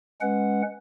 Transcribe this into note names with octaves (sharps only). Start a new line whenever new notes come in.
G#3 C#4 B4 F#5